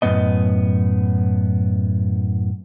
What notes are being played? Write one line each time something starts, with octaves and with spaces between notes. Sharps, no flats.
F#2 A2 G#3 B3 D#5